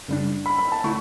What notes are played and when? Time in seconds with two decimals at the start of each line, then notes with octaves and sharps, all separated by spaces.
0.08 F#2 C#3 G3 D4
0.46 B5
0.58 B5
0.72 A5
0.84 D3 A3 E4 C#6